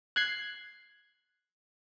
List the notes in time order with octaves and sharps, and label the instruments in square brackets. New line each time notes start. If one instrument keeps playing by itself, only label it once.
[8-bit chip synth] F#6 G#6 C7